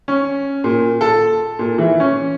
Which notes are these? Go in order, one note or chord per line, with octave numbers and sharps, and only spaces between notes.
C#4
A#2
A4
A#2
E3
C#4